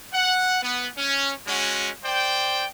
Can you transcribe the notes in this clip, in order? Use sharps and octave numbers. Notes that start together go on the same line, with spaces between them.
F#5
B3
C#4
G#3 C#4 F#4
C5 D5 G5